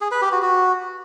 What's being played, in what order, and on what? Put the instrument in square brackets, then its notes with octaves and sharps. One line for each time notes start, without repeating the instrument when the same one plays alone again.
[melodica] G#4
B4
G4
F#4
F#4